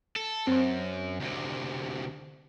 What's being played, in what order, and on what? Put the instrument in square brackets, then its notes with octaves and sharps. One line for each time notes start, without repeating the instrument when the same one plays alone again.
[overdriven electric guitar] A4
[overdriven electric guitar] F#2 [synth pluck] C4 C5
[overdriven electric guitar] D2 C3